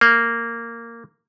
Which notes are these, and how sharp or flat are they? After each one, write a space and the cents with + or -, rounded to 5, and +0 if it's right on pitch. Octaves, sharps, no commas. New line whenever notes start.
A#3 -10